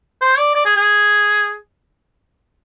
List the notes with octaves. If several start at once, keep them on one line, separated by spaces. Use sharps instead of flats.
C5
D5
D5
G#4
G#4